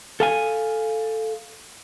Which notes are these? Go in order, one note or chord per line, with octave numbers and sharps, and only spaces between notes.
A4 F5 G#5